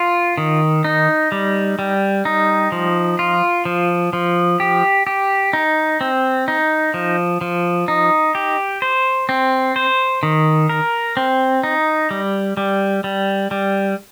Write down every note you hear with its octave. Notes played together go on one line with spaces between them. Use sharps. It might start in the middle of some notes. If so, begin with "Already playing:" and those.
Already playing: F4
D#3
D#4
G3
G3
D#4
F3
F4
F3
F3
G4
G4
D#4
C4
D#4
F3
F3
D#4
G4
C5
C4
C5
D#3
A#4
C4
D#4
G3
G3
G3
G3